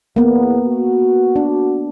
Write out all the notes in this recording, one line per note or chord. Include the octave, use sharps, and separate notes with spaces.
E2 A#3 B3
F#4
D4